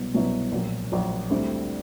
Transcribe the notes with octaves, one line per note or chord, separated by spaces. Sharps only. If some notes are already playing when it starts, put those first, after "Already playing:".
Already playing: C2 B2 F#3 B3 E4
C2 B2 F#3 B3 E4
A#1 A#2 F#3
A#1 A#2 F#3
D2 D3 G3 C4 E4